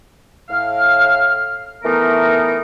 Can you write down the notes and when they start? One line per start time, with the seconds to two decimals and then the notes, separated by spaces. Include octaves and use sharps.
0.49 A2 F5 F6
1.83 E3 A3 B3 D#4 A#4